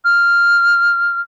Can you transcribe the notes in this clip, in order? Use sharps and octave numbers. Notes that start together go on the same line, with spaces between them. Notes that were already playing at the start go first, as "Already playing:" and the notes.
F6